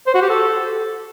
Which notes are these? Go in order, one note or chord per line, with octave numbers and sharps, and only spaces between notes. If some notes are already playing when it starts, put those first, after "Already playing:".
C5
F#4
G4
A4